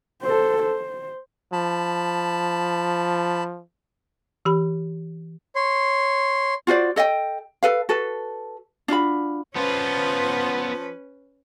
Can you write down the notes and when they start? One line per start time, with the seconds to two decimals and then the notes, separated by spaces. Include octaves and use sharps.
0.22 A4 C5
0.62 C5
1.53 F3 A5 B5
4.45 E3 G4 B5
5.56 C#5 C6
6.67 F4 F#4 C5 D5
6.96 A4 D#5 E5 G5
7.63 A4 B4 F5
7.89 F#4 A4 B4
8.88 D4 F4 F#4 B5
9.56 F3 B3 C#4 F4 B4